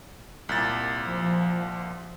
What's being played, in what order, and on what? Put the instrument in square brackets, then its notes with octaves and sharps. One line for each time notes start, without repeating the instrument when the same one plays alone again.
[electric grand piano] C2 A#2 A6
[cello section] F3